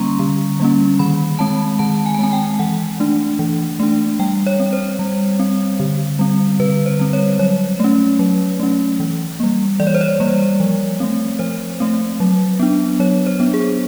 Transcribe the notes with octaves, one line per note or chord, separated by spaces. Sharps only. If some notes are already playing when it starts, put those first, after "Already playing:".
Already playing: D3 G3 A#3 C#4 A#5 C6 C#6
D3
G3 A#3 C#4
D#3 B5
G#3 C4 A5
D#3 A5
G#5
A5
G#3 C4 G#5
G5
E3 F#5
A3 D4
E3
A3 D4
G3 G5
C#5
C4
C5
G3
C4
D3
G3 C4
D3 B4
C5
G3 C4
C#5
F#3 C#5
A3 C#4
F#3
A3 C#4
E3
G3 A#3
E3 D5
C#5
C5
C#5
G3 A#3
F3
A3 C4
F3 C5
A3 C4
F#3
B3 D4
F#3 C#5
C5
B3 D4
G#4